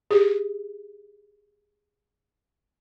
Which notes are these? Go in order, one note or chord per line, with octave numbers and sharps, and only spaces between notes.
G4 G#4